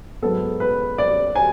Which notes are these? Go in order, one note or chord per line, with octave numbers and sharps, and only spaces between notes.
G#2 F#3 B3 A4
B4
D5
G#5